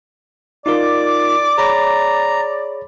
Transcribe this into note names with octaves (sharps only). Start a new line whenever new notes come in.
D#4 F4 A#4 D5 D6
G#4 C#5 A#5 B5